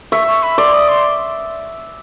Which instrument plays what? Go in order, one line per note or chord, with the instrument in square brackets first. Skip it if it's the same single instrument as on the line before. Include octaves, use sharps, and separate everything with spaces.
[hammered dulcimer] E5 [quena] C#6
[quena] C#6
B5
[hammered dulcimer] D5 [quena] C6
[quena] D#6
C6